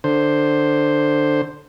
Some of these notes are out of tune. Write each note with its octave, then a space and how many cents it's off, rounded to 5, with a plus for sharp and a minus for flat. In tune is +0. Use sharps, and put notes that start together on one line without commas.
D3 +10 C5 +5